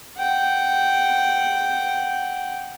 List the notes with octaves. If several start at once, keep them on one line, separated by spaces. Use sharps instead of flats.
F#5 G5